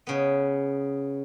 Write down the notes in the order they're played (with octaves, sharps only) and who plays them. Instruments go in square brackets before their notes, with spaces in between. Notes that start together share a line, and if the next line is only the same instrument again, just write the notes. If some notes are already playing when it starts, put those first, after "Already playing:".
[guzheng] C#3 B3